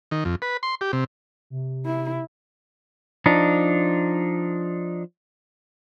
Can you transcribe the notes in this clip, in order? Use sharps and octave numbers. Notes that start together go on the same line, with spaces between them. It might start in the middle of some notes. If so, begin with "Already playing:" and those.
D#3
F2
B4
C6
G4
C3
C3
E4
F3 D4 D#4